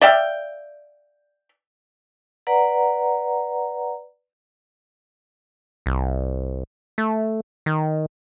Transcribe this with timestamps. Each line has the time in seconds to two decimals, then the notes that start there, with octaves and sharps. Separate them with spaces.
0.01 D5 E5 F5 G5
2.47 B4 D5 F#5 A#5
5.86 C2
6.98 A3
7.66 D#3